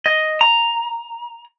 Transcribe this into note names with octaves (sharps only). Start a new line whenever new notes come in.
D#5
A#5